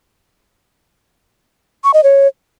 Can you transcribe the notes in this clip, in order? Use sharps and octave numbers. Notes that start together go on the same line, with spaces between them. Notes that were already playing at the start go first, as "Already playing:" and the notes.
C#6
D#5
C#5